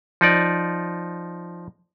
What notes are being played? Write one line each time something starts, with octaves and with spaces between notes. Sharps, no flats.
F3 D#4 D5